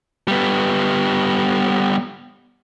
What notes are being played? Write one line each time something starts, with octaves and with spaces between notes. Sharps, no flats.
G3 B3